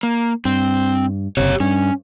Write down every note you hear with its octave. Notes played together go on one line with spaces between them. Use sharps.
A#3
G2 C4
F#1 C3 G4 C#5
G2 C#4